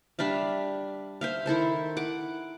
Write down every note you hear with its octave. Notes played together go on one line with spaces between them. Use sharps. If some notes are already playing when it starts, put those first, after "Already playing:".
G3 D4 E5 F5
C5 E5 F5
D#3 E4 A4 C5
F#5 D6